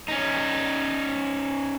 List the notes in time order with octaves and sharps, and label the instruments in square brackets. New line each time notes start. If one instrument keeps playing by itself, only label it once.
[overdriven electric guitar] C#4 D#4